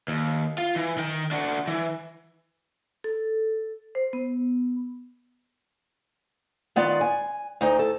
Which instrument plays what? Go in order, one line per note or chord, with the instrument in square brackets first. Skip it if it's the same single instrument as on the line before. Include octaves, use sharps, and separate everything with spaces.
[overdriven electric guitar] D#2
F4
E3
D#3 G5
D4 F#4
E3
[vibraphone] A4
C5
B3
[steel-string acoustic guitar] D#3 B3 F4 D5
G#5
D2 D#4
A4